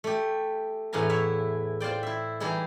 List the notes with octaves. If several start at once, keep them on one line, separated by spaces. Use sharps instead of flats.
A3 G4
E2 A2 B4 F5 G#5 A#5
E4 C#5 E5
F4 C5 D5 G5
E4 E5
E3 G3 D#4 E4 G#4